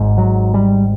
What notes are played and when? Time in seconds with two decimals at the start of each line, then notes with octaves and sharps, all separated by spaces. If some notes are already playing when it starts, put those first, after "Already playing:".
Already playing: G#1 G#2
0.18 F#3
0.54 G3